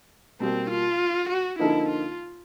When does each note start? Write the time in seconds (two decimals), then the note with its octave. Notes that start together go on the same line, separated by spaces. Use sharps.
0.40 B2 G3 A#3 C4
0.70 F4
1.29 F#4
1.59 D3 F3 A#3 D#4 E4
1.89 F4